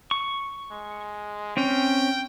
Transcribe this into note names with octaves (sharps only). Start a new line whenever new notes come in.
C#6
G#3
C4 C#4 G5